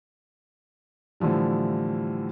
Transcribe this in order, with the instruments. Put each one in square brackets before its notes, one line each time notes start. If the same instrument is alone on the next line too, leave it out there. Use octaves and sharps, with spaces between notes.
[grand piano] A2 D3 E3 F3 G3